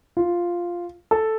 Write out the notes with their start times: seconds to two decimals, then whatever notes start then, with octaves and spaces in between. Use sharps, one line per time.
0.17 F4
1.11 A4